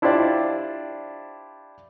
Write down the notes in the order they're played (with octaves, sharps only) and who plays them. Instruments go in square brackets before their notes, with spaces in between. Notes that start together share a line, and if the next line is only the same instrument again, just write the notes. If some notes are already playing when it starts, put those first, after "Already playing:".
[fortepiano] D4 E4 F4 G4 C5 D5